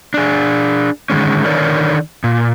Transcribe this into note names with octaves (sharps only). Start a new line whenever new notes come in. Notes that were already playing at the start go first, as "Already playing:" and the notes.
D4 G#4
D3 D#3 G#3 C#4
D3 D#3 D#4 A#4 C#5 D5
A#2